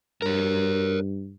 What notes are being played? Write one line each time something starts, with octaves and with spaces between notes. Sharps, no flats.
G2 A#4 C#5